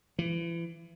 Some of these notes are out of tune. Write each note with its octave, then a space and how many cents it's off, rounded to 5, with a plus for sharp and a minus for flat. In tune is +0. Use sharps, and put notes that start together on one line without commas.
E3 +35